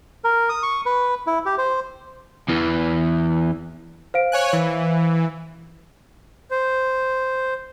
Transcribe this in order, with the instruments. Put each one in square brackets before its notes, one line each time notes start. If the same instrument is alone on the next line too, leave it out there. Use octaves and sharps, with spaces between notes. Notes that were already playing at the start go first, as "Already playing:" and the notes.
[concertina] A#4
D#6
C#6
B4
E4
G4
C5
[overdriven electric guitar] E2 E3
[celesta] C5 F5 D7
[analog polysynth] C#5 G#5 F#6
E3
[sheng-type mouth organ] C5